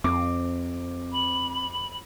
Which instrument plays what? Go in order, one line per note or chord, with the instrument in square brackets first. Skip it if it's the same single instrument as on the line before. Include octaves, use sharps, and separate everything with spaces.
[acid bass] F2 [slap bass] C4 [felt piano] D6
[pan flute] B5